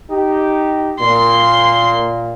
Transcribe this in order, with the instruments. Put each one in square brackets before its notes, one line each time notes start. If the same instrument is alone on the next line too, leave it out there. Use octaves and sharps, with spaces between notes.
[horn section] D#4 G4
[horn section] A#2 [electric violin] C6